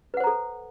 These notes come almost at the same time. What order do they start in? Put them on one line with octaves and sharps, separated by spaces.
B4 F#5 C5 A#5 A4